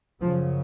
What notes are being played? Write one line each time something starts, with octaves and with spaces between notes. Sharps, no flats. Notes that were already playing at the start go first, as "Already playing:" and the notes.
F#2 C#3 F3